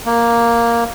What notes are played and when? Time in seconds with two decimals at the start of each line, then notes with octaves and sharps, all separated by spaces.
0.06 A#3